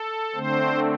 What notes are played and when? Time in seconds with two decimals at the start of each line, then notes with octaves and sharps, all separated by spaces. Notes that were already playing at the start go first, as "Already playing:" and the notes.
Already playing: A4
0.35 D3 A3 C4 C5